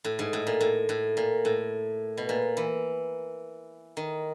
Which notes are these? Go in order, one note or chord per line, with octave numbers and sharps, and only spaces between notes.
A2
G#2
A2
A#2
A2
A2
A#2
A2
B2
A#2
E3
D#3